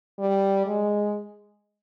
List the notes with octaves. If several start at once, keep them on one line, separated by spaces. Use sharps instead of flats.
G3
G#3